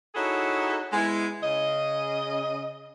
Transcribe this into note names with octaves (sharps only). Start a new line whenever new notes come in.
D#4 E4 F#4 G#4 A4 C#5
G#3 B3 E4
C#3 D#5